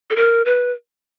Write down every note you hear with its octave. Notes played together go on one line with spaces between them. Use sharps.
A4
A#4
B4